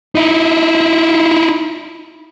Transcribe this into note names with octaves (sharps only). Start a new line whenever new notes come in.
D#4 E4